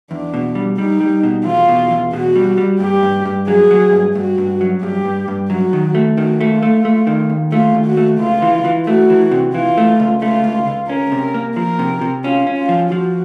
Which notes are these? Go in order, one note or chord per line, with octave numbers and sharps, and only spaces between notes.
E2 D4
B2
G3
G3 D#4
G3
B2
E2 F4
B2
E2
B2 F#4
G3
G3
G2 G4
G2
G2
F#3 G#4
F#3
G2
G2 F#4
G2
F#3
G2 G4
G2
G2
F#3 F#4
D#3
A3
D#3 F#4
A3
F4
A3
A3
D#3
D#2
A3 F4
D#2
F#4
A3
C#2 F4
E3
E3
A3 F#4
E3
C3
E3 F4
A3
C#2
A3 F4
C#2
C#2
C#4 A#4
C3
A#3
F3 A#4
C3
C3
C#4 F4
C#4
F4
F3
F3 F#4